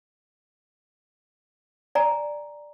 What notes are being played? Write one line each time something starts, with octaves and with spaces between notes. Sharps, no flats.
D5 G#5 A#5